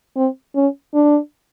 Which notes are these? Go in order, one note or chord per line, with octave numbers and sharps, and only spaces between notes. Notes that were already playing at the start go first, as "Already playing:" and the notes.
C4
C#4
D4